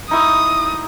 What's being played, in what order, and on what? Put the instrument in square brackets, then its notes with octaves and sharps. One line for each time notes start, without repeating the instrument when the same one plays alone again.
[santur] D#4 E4 C#6 [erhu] D#6